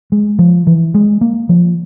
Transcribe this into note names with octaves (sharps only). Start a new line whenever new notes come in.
G#3
F3
E3
G#3
A#3
F3